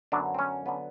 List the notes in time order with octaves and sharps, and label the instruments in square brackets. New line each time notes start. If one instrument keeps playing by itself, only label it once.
[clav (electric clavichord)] F#2 D3 F#3 B3 D4
C4
C#4
D3 F#3 B3